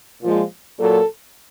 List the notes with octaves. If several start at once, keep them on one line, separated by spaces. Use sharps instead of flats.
A#2 F3 G#3
A#2 F#3 A4